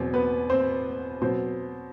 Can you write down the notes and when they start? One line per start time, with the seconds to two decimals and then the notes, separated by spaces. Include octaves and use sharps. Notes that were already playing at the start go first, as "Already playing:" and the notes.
Already playing: E2 B2 F#3 C4 C5
0.14 B3 B4
0.50 C4 C5
1.21 B2 F#3 C4 C5